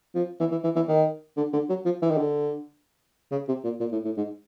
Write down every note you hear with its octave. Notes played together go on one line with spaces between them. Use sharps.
F3
E3
E3
E3
E3
D#3
D3
D3
F#3
F3
E3
D#3
D3
C#3
C3
A#2
A#2
A2
A2
G#2